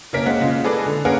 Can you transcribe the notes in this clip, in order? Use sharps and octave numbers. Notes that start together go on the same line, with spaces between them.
C#3 A#3 C#4 A#4 B6
G#3 A#3 C4 F#5
C#3 G#3 F4
G#4 A4 B4 D5 D#5
D3
A#3 B3 C#4 G#4 A#4 F#5